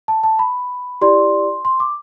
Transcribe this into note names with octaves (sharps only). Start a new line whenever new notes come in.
A5
A5
B5
E4 G4 D5 C6
C6
D6